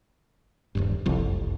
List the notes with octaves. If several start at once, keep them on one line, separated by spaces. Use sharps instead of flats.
D#1 G#1 G2
F#1 C2 F2